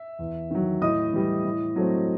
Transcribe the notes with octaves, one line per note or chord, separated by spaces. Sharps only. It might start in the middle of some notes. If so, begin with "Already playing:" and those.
Already playing: E5
E2
D#3 F#3
A2 D#5 D#6
E3 G3
A2
F#3 A3 C4